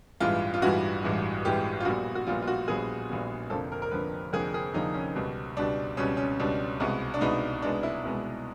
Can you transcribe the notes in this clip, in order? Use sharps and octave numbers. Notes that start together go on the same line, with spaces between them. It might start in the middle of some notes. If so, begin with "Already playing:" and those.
A1 G2 E3 G#3 F4
F4
A1 G2 E3 G#3 F#4
A1 G2 E3 G#3
A1 G2 E3 G#3 G4
F4
A#1 A#2 G3 B3 F#4
F#4
A#1 A#2 G3 B3 F4
F4
F#4
A#1 A#2 G3 B3 G#4
A#1 A#2 G3 B3
F1 F2 D3 F3 A#3 A4
A#4
A#4
F1 F2 D3 F3 A#3 B4
F1 F2 D3 F3 A#3 G#4
G#4
F1 F2 D3 F3 A#3 D#4
C#4
C#2 B2 G3
C#2 B2 G3 D4
C#2 B2 G3 C#4
C#4
C#2 B2 G3 D4
C2 B2 G#3 B3
D4
C2 B2 G#3 B3 D#4
C2 B2 G#3 B3 D4
E4
C2 B2 G#3 B3 E4